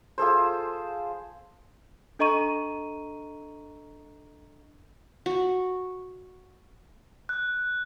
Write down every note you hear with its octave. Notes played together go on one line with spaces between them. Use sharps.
F4 G#4 A4 C5
D4 A4 D#5 A#5 C#6 D#7
F#4
F#6